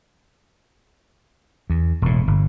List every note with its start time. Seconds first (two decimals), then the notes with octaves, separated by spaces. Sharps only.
1.70 E2
2.02 E1 A2
2.27 G1